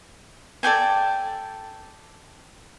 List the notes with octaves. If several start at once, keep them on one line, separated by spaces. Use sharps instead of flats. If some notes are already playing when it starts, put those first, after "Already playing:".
A4 D5 G5 G#5